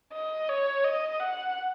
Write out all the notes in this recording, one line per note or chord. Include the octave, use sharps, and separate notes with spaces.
D#5
C#5
D#5
F#5